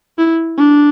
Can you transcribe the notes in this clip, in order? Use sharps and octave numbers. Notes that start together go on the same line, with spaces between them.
E4
D4